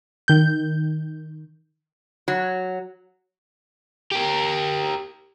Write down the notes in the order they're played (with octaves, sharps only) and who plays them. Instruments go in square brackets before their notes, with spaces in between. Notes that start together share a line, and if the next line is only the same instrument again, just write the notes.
[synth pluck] D#3 G6
[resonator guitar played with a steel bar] F#3
[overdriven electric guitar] G4 A#4